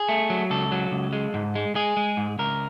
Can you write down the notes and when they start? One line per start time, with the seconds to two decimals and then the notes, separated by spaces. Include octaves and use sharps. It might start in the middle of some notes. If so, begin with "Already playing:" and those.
Already playing: G#4
0.09 A3
0.30 F#3
0.50 C#2 A4
0.72 F#3
0.92 C#2
1.13 G#3
1.34 G#2
1.55 G#3
1.75 G#3 G#4
1.97 G#3
2.17 G#2
2.39 C#2 A#4